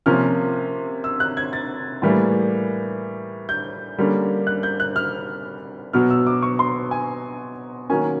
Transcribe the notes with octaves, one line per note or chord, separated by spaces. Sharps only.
C3 F3 A#3 C#4 F6
E6
F#6
G#6
A6
A2 E3 G3 A#3
G6
D3 G3 A#3 C#4
F#6
G6
F#6
F6
B2 F#3 B3 F6
E6
D6
C#6
C6
G#5
D#3 F#3 A#3 C#4 G#5